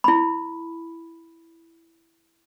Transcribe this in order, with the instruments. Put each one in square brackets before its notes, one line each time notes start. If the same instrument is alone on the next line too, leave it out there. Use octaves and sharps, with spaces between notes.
[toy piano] E4 B5